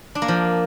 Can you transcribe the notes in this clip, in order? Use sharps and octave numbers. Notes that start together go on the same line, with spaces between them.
D4
A#3
F3